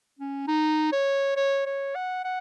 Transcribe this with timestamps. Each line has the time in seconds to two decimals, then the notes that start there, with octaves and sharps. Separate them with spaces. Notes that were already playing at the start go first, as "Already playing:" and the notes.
0.19 C#4
0.48 D#4
0.93 C#5
1.37 C#5
1.66 C#5
1.96 F#5
2.25 F#5